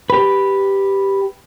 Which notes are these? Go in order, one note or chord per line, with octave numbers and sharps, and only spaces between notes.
G4 B4